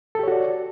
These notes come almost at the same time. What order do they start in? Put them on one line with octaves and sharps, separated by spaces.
A4 G4 C#5 F#4 D5